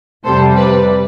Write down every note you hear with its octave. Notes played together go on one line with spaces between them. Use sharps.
F2 C3 G3 A4 C5
B4 D5